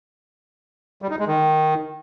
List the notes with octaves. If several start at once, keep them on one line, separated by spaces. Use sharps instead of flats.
G3
D#4
G#3
D#3